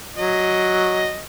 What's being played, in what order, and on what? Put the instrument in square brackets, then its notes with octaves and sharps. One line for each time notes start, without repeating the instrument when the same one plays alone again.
[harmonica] F#3 D#5